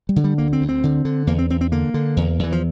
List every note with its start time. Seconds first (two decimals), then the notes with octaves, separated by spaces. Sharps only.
0.09 G3
0.16 D3
0.24 G3
0.38 D2 A#3
0.53 C4
0.61 D2
0.69 C4
0.84 D3
1.05 D3
1.27 E2 A#3
1.38 C4
1.50 E2 C4
1.61 C4
1.72 D3 A#3
1.94 D3
2.17 E2
2.39 E2 E3
2.52 F3